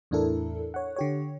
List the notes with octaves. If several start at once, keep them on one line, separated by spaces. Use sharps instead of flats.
E2 A2 D4 E4 A4 A#4
C#5 F#5
D3 G4 C#5